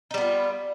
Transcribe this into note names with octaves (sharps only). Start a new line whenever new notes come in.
G3 B3 D#4 F4